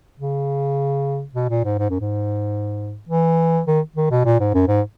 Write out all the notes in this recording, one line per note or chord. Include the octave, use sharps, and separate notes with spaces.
C#3
B2
A#2
G#2
G#2
F#2
G#2
E3
D#3
D#3
B2
A#2
G#2
F#2
G#2